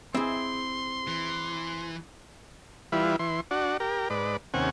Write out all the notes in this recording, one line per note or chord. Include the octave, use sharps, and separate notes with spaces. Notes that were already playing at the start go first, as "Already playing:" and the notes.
C4 E4 G#4 C6
E3
E3 G3 E4 F4 B4
E3 C6
D4 F#4
G4 A#4
G#2 B4 D5
D#2 C3 C#4 F#5 G#5